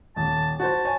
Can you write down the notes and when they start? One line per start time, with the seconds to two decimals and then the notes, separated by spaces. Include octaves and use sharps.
0.16 D#1 A5
0.60 F#4 C5 A5
0.85 C#5 G#5